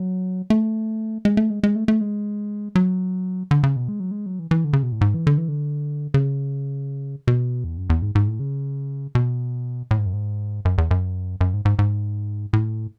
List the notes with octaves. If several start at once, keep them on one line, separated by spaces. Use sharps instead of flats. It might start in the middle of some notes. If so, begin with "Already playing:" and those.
Already playing: F#3
A3
G#3
A3
G#3
G#3
A3
A3
G#3
F#3
D3
C#3
B2
G#3
F#3
G#3
F#3
E3
E3
D3
C#3
B2
A2
G#2
E3
D3
E3
D3
C#3
B2
E2
F#2
E2
G#2
G#2
A2
C#3
B2
A2
G#2
F#2
G#2
F#2
E2
F#2
F#2
G#2
G#2
G#2
A2